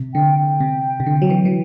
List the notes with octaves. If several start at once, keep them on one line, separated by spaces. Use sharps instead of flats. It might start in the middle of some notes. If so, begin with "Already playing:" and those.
Already playing: C3
D3 G5
G5
C3
C3
D3
F#3
E3
E3